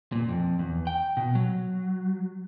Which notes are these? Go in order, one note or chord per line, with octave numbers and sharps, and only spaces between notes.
A#2
F2
E2
G5
B2
F#3